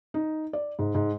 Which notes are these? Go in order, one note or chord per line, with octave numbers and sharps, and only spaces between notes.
D#4
D5
G#2
G#2